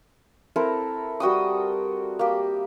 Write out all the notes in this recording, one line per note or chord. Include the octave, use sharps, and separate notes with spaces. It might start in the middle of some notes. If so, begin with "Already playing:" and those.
C4 E4 A4 A#4
G3 F#4 G5 D#6
A#3 G4